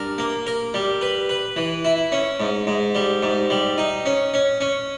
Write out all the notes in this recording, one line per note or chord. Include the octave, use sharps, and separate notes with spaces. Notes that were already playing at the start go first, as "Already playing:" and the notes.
Already playing: G2 A#4
A#3
A#4
G3
B4
B4
E3
E4
C#4
G#2
G#2
G3
G#2
G3
D#4
C#4
C#4
C#4